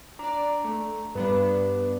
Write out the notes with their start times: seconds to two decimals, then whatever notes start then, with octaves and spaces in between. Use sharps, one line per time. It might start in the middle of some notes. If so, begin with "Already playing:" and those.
0.19 D4 D5 A#5
0.64 A3
1.15 G2 B3 D4 B4 B5